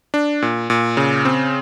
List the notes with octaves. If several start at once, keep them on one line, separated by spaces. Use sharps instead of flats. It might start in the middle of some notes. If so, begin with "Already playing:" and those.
D4
A#2
A#2
C#3
C4